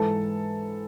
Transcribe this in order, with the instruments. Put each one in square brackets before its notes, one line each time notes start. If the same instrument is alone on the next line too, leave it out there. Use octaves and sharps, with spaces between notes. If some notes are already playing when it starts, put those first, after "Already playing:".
Already playing: [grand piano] G#2 E3 A4